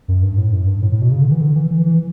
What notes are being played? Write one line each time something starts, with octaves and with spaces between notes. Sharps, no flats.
F#2
G2
A2
F#2
G2
A2
A2
B2
C#3
D3
E3
D3
E3
E3
E3